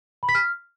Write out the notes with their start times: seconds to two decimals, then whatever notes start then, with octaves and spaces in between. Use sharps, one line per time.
0.23 B5
0.29 B6
0.35 F6